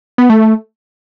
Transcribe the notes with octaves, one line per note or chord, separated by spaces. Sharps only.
B3
A3